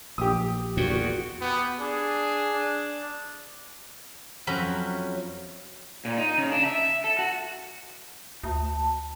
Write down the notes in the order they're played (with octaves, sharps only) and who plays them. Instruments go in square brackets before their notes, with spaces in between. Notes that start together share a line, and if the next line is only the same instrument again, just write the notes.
[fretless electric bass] A#1 [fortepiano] G4 D#6
[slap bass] E2 A#2 [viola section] F#4
[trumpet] B3 [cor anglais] G4
[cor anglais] D4 [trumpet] G#4
[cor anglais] D4
[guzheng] F2 F#3 C#4 E5 A#5 B5
[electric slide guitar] A#2
D#4
C#3
D4
E5
A4
F#4
[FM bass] D2 [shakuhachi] A5